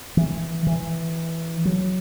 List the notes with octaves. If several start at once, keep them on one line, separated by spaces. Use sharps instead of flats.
E3
E3
F#3